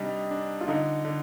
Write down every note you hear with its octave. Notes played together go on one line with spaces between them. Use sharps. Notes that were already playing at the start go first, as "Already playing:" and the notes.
Already playing: C3 G3 D4 D#4
D4
F4
D3 D#4
D3